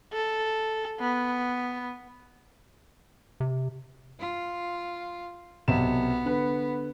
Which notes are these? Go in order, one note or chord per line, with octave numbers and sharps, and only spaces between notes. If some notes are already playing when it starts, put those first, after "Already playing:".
A4
B3
C3
F4
B1 C3 B3 E7
D3 B4